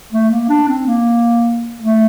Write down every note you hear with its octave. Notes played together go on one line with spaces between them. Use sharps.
A3
A#3
D4
C4
A#3
A3